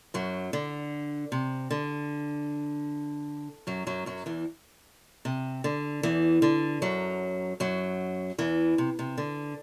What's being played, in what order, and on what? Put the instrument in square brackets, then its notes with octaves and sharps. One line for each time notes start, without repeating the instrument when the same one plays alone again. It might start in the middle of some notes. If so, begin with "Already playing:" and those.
[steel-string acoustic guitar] F#2 F#3
D3
C3
D3
F#2 F#3
F#2 F#3
F#2 F#3
E2 E3
C3
D3
E2 E3
D3
F#2 F#3
F#2 F#3
E2 E3
C3
C3
D3